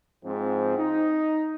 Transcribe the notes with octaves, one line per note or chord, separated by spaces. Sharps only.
G#2 F3 C4
D#4